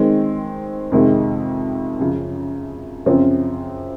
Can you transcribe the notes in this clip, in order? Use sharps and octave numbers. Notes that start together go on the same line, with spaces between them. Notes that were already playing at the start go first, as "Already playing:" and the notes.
Already playing: D#3 G#3 C4
F2 C3 D#3 G#3
F#2 C#3 F3
F#2 C#3 F3 C4